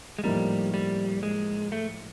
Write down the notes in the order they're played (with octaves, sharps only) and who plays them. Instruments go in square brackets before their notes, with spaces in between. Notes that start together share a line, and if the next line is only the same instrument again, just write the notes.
[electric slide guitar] G#3
[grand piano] A2 F3 A#3 D#4 [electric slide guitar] G3
[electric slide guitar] G3
G#3
A3